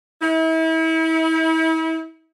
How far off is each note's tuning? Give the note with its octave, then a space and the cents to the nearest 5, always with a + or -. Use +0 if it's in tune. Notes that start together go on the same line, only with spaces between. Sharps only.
E4 -35